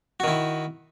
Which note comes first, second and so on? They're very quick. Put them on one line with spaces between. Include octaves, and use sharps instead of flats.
F#4 D#3 E4